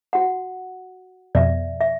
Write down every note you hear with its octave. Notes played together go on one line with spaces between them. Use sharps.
F#4 F#5
F2 B2 D5 E5
E5